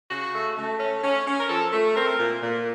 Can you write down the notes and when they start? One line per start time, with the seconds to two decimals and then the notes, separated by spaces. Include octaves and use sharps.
0.10 C#3 F#4
0.33 A3
0.57 A3
0.80 C#4
1.03 C#4
1.27 C#4
1.39 A#4
1.50 F3 A4
1.73 A3
1.96 C4 A#4
2.19 A#2
2.42 A#2